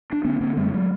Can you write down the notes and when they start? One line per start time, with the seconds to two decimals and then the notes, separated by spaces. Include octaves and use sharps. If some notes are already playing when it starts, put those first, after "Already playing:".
0.12 D4
0.25 D3 B3 C#4
0.41 D3 A#3 C4
0.57 F#2 G3 A3
0.74 F#3 G#3